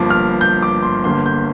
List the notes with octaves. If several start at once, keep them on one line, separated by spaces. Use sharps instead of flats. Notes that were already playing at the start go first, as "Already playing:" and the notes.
Already playing: G1 G2 F3 A#3 D6
F6
G6
D6
C6
G1 G2 D3 A#3 C6
G6